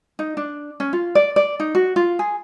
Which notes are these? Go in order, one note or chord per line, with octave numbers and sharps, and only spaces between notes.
D#4
D4
C#4
F4
D5
D5
D#4
F#4
F4
G#4